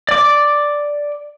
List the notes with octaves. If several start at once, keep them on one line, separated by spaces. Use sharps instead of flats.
D5 D6